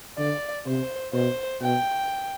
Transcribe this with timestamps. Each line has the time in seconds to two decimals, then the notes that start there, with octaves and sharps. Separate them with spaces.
0.18 D3 D5
0.66 C3 C5
1.13 B2 C5
1.61 B2 G5